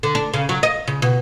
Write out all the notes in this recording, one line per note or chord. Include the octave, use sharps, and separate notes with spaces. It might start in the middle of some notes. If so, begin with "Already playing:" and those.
D3
D4
C#3
F#3
D#5
C#3
B2